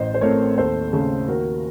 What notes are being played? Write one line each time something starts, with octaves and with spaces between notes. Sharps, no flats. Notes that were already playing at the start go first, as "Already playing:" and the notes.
Already playing: A1 C5 D#5
C5
A2 A3 C4 A#4 C#5
D#2 A4 C5
C#3 A3
D#2 F#4 A#4